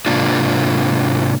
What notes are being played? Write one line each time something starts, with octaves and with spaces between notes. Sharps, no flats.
G#2 C3 A#3 D4 F4